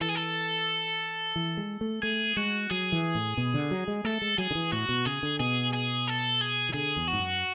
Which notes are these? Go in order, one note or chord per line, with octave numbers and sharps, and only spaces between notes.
E3 A4
G#4
A4
E3
G#3
A3
A3 G#4
G#3 F#4
F#3 G#4
E3
A2
B2
D3
F#3
G#3
A3 A4
G#3
F#3 G#4
D3
E3
A2 F#4
B2
C#3 G#4
D3
B2 G#4
G#4
A4
G#4
E3
D3 G#4
E2
F#4
G#2
F#2